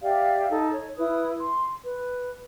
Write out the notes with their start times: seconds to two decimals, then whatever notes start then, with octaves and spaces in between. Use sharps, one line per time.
0.03 G4 D5 E5 F5
0.49 D#4 A4
0.72 C#5
0.97 E4 B4 D#6
1.39 C6
1.84 B4